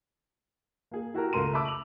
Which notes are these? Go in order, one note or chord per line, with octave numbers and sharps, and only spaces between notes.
A#3 G#4
E4 F#4 G4 A#4
C#2 A3 A#4 C6 D#7
E5 A5 B5 D6 E6
F7 F#7